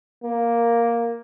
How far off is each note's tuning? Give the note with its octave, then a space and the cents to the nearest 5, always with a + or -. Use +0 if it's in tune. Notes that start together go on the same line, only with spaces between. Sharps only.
A#3 +5